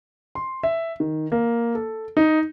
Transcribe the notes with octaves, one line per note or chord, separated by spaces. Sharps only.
C6
E5
D#3
A#3
A4
D#4